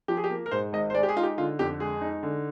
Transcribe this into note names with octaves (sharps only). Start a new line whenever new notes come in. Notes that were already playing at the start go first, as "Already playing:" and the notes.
F3 G4
G#4
G4
A#3
A#4
G#2 C5
G#1 D#5
C5
G#3 D5
G4
G#4
D#4 F4
G4
D3 F4
F2 G4
G#3 G#4
D#4
D3